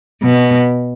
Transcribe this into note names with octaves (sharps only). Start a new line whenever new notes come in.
B2